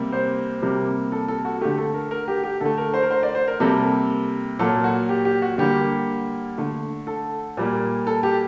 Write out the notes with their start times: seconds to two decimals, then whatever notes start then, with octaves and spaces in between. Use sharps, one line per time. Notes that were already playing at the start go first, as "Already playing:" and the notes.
Already playing: C3 G3 A#3
0.12 C5
0.62 C3 G3 A#3
1.12 A4
1.28 A4
1.45 F#4
1.61 D3 A3 G4
1.78 A4
1.94 A#4
2.11 A#4
2.28 G4
2.44 G4
2.60 D3 A3 A4
2.78 A#4
2.94 C5
3.03 A#4
3.11 C5
3.23 D5
3.35 C5
3.48 A#4
3.60 C3 G3 A#3 A4
4.59 A#2 F#3 A#3 A4
4.84 F#4
5.09 G4
5.25 G4
5.42 F#4
5.58 D3 G3 A#3 G4
6.58 D3 A3
7.07 A4
7.57 A#2 G3 A#3
8.07 A4
8.23 G4